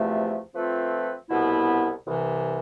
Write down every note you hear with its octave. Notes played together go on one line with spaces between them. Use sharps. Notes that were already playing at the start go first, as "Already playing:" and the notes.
Already playing: E2 C3 F3 A3
F3 A3 C4 F4 B4
C2 B2 B3 E4
C2 C3 E3